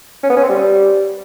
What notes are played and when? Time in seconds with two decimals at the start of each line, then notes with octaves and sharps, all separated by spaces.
0.24 C#4
0.30 B3
0.37 C#4
0.43 C4
0.50 G3